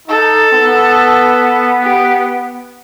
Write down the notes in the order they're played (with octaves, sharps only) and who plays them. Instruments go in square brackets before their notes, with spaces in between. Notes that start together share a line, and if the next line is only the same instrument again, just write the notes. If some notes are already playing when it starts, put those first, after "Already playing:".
[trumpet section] D#4 [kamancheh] A4
[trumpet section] B3
[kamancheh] G4